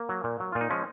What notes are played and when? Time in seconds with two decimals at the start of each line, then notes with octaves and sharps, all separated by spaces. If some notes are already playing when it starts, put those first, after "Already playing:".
Already playing: A#3
0.09 F#3
0.24 A#2
0.40 F#3
0.52 A#2 F4
0.61 D#4
0.70 F3 G#3 C#4